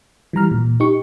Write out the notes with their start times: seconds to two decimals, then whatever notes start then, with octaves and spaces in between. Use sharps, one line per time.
0.33 E3 G3 A#5 F6
0.51 A#2
0.80 D#4 G4 C#6